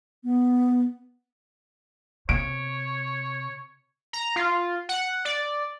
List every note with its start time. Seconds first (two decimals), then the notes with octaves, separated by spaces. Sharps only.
0.24 B3
2.29 C3 C#5 D7
4.13 A#5
4.36 F4
4.89 F#5
5.25 D5